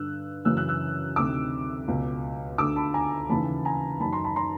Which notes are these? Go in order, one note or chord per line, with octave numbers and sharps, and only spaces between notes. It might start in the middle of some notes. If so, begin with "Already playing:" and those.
Already playing: G2 D3 E6 F#6
F#2 C#3 E3 E6 F#6
E6 F#6
E6 F#6
D2 C3 D#3 D6 E6
C#2 B2
D2 D3 D6 E6
A5 B5
G#5 A#5
D#2 C#3 E3 A5 B5
G#5 A#5
F#2 D#3 A5 B5
A#5 C6
A5 B5
A#5 C6